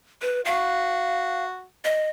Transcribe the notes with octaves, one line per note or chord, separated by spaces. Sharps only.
B4
F#4 F5
D#5